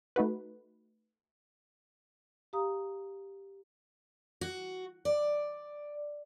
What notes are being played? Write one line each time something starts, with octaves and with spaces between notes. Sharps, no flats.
A3 D#4 F#4 B4
G4 F5 A#5 D#6
F#4
D5